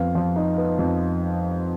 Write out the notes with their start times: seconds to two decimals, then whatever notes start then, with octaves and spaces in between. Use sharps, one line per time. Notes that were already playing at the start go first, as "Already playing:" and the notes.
Already playing: F2 B3 F5
0.15 F3
0.36 D#4
0.58 B3
0.79 F2